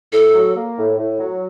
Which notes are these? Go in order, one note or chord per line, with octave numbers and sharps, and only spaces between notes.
A2 A4
F#3
A#3
A2
A2
F#3